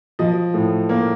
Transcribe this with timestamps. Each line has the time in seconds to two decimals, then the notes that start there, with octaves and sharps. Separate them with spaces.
0.19 F3 D#5
0.54 A2
0.89 A#3